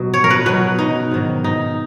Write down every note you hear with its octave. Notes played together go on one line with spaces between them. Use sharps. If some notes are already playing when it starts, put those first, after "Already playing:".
Already playing: B2 F#3
C#5
A#4
B4
B2 F#3 B4
D#4
G#2 D#3 F#3
D#4